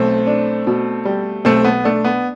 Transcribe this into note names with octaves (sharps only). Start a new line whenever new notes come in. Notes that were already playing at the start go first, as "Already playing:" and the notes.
Already playing: B1 A3 C4
D4
B2
G3
B1 A3 C4
B3
A3 D4
B3